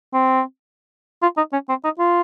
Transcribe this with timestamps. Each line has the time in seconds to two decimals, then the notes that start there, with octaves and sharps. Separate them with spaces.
0.13 C4
1.22 F4
1.37 D#4
1.53 C#4
1.69 C4
1.84 D#4
1.99 F4